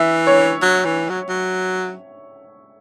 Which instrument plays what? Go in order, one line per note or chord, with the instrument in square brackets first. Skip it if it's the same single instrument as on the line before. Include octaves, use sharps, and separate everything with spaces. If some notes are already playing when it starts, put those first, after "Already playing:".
Already playing: [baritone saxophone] E3 [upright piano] E5
[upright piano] C#5
[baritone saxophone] F#3
E3
F#3
F#3